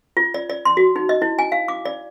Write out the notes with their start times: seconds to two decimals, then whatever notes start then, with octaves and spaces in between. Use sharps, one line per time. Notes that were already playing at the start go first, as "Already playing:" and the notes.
0.17 F4
0.34 D5
0.50 D5
0.65 C6
0.77 F#4
0.96 D#4
1.09 D#5
1.22 E4
1.39 G#5
1.52 F5
1.68 D6
1.85 D5